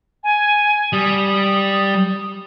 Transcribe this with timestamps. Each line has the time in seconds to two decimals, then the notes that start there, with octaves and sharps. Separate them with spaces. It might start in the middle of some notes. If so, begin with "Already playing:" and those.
0.24 G#5
0.93 G3 D#6